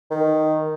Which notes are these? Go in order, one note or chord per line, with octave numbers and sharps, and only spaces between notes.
D#3